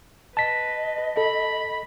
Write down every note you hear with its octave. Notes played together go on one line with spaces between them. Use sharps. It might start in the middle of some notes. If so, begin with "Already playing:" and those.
B4 D#5 A5 B6
A4 B5